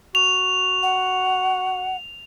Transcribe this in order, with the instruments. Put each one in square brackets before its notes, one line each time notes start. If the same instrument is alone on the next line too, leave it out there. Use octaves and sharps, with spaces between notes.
[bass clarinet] F#4 [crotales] F7
[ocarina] F#5